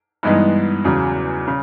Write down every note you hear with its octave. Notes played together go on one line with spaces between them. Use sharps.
G2 E3 G#3 B3 D#4
E2 C#3 F#3
C#3